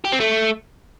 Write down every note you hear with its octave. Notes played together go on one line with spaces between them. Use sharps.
G4
C4
A3